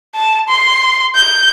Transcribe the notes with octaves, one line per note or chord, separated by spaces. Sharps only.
A5
C6
G6